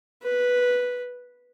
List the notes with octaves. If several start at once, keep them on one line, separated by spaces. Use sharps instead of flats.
B4